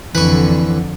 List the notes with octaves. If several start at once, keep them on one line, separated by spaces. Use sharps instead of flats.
F2 D3 E3 B4 C#6